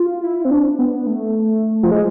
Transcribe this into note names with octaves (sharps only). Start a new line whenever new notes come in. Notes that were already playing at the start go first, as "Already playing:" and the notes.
Already playing: F4
E4
C4
D4
B3
A3
F3
G#3